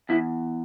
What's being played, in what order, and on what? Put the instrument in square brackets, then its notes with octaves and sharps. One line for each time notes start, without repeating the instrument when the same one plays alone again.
[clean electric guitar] E2 E4